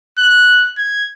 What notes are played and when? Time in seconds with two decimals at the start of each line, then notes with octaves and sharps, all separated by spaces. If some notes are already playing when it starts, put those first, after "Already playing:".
0.19 F#6
0.78 G#6